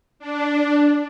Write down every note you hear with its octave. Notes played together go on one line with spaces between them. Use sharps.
D4